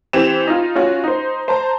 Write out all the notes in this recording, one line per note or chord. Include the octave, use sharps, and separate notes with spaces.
E3 C4 G4 E7
D#4 F4
C#4 F4 F#4
D#4 C5
C5 A5 A#5